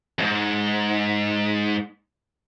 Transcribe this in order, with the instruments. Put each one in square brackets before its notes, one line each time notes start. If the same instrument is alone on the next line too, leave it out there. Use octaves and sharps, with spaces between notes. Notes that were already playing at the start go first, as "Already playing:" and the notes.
[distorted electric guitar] F2 G#2